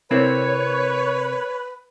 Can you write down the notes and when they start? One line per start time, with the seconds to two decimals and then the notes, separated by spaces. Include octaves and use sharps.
0.11 C3 C4 E4 A#4 B4 C#5